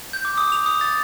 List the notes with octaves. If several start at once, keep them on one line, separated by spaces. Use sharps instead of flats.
G6
D6
D#6
F7
D#6
A6